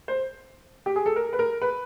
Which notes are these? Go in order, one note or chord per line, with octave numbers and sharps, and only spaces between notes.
C5
G4
G#4
A4
A#4
B4
A#4
B4